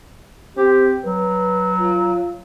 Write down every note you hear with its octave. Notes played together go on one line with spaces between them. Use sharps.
C4 G4
F#3 B4
F4